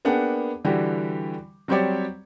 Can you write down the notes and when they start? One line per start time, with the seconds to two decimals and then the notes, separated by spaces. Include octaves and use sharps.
0.05 A#3 B3 D4 G#4 F#5 G5
0.65 D3 E3 G3 F#4 G4
1.68 F#3 G3 C4 G4 C#5 D5